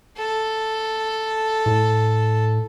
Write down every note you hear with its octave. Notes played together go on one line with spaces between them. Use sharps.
A4
A2